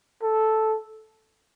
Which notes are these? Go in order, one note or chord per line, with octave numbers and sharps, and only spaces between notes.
A4